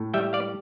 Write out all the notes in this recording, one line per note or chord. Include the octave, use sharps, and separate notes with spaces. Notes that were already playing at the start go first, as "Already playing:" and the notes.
Already playing: A2
G3 E5 G5
D5 F5